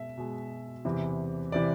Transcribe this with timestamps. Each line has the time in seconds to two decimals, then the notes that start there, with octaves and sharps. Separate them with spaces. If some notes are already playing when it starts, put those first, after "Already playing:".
Already playing: B2 G#3 E5
0.17 B2 G#3
0.85 E2 C3 E3
1.52 C3 E3 D5